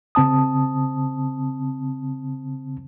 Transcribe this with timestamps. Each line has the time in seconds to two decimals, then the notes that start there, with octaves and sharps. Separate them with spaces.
0.15 C#3 C4 A5 D#6